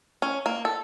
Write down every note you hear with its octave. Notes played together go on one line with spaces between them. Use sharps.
C#4
A#3
A4